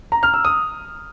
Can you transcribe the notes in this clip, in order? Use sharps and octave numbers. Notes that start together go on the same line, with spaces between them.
A#5
F6
E6
D#6